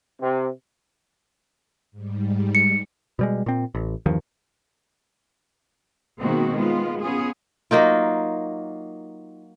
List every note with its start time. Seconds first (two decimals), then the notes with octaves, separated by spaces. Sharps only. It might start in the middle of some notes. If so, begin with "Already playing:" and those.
0.21 C3
1.92 G#2 G3
2.55 C#7
3.19 B2 G3 G#3
3.46 A#2 C4
3.75 A1
4.06 E2 G2 D#3 F3
6.20 B2 D#3 G#3 A#3 C4 F#4
6.55 G#3 B3 F4
7.01 B3 C#4 F4 G#4
7.71 F#3 A#3 D#4 F4